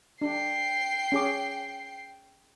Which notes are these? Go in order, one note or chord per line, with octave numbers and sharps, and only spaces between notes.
D4 G5 C7
C#4 G#4 D6